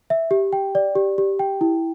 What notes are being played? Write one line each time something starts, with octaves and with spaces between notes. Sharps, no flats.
E5
G4
G5
D5
G4
G4
G5
E4